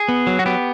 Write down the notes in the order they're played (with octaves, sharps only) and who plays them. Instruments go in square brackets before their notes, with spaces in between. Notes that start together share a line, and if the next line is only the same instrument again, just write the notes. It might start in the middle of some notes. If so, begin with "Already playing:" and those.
Already playing: [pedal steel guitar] G#4
B3
F#3
F#4
B3 G4